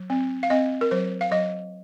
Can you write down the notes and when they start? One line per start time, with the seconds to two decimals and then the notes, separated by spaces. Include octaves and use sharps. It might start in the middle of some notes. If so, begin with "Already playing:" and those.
Already playing: F#3
0.10 C4
0.43 F5
0.50 C4 D#5
0.81 A#4
0.91 F#3 C5
1.21 F5
1.31 F#3 D#5